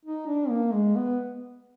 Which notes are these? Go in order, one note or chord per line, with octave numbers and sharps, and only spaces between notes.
D#4
D4
A#3
G#3
B3